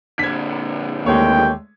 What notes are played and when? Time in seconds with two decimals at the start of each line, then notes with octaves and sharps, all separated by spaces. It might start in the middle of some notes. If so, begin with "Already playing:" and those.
0.19 A#2 D3 G#6 B6
1.06 D#2 G#3 A3 G4 C#5 G5